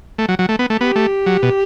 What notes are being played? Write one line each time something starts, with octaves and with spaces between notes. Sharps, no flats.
A3
F#3
F#3
A3
B3
A3
B3 G4
A3
F#3
B2